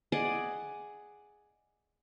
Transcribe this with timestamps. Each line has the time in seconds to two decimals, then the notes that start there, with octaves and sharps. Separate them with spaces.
0.12 G#4 D5 D#5 F#5